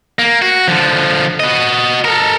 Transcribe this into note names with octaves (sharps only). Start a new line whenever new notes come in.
A#3
F#4
D3 F3
F#4 D#5
A4 A#4